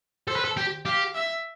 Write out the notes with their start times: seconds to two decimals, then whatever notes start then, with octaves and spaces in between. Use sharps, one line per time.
0.28 A4 C5
0.36 B4
0.45 A4
0.57 G4 G5
0.85 G4 F5
1.15 E5